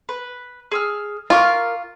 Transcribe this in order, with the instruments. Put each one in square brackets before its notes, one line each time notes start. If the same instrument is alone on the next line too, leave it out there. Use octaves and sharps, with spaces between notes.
[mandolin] B4
G#4 E6 F6
[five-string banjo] F4 [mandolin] A#4 C#6 D6